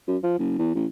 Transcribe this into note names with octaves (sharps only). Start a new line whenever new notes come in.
F#2
F3
F#1
E2
A1